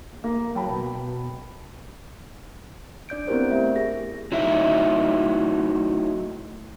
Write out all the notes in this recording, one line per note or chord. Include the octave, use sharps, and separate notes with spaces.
A#1
A#3
F#3 G5 A5 B5
B2
D4 D5 G6 D7
B3 C4 E4 G4 A#4 C5
A3 E5
G4 G#4 A#6
F#3 A3 D#4 E4 E5